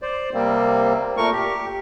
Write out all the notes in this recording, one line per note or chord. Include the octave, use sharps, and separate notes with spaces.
C5 D5
C3 G3 A#3 C4
A#2 A3 A#4 C#6
G4